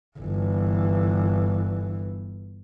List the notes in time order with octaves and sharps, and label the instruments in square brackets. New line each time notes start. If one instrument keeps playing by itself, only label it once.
[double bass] G1 E3